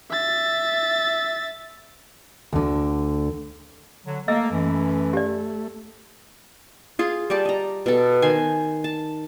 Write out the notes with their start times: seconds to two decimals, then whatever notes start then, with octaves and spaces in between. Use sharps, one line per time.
0.11 E5 A6
2.53 D2 D3
4.06 D3 F#3
4.28 A3 A#3 D#5 E6
4.52 F#2 E3
5.13 G4 D5
6.99 F4 G#4
7.30 G3 G4 D5 A5
7.45 D#5 A#5
7.86 B2 A4
8.22 D#3 C5 G#5
8.84 A5